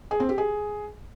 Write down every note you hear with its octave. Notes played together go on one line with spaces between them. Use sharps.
G#4
C4
G4
G#4